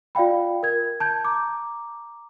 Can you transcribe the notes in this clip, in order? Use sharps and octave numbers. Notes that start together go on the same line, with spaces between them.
F4 D5 F5 G5 B5
A#4 G#6
A5 G6 G#6
A#5 D6